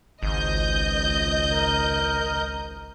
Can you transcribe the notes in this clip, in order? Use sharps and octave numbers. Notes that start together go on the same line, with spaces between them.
G#1 C#2 D#5 G6
A#4